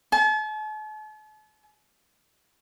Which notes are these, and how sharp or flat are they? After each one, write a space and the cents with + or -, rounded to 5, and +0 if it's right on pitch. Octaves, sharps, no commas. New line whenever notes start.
A5 -45